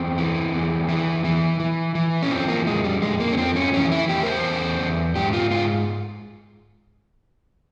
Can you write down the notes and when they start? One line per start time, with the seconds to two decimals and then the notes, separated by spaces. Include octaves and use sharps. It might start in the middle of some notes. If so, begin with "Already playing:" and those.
Already playing: E2 C4
0.18 E3
0.53 E2
0.89 E3
1.24 E3
1.60 E3
1.95 E3
2.22 C#4
2.31 F3 C4
2.48 A#3
2.66 F2 G#3
2.84 G3
3.02 F2 G#3
3.20 A#3
3.32 C#4
3.37 F2 C4
3.56 C#4
3.73 E3 C#4
3.92 E4
4.08 E2 G4
4.23 A#4
4.26 C5
4.44 E2
4.80 E2
5.16 G#2 G4
5.33 F4
5.51 G#2 F4